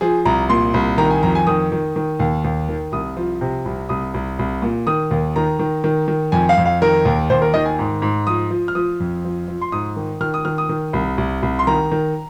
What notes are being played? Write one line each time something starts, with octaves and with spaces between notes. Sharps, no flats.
F3 G#4
C2 A#5
A#2 C6
C2
D#3 A#5
G#5
F2 A#5
G#5
D#3 D#6
D#3
D#3
D#2
D#2
D#3
C2 D#6
F3
C3
C2
C2 D#6
C2
C2
A#2
D#3 D#6
D#2
D#3 A#5
D#3
D#3
D#3
F2 G#5
F5
F2
F5
D#3 A#4
D#2
D#2 C5
A#4
D#3 D#5
G#5
G#2
G#2
F3 D#6
F3
F6
F3 D#6
F2
F3
F3
C6
G#2 D#6
D#3
D#3 F6
D#6
D#3 F6
D#6
D#3
C2
C2
C2
C6
D#3 A#5
D#3